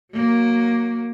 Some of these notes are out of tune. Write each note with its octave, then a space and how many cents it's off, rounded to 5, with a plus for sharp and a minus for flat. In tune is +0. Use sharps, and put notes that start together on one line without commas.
F#3 -5 A#3 +5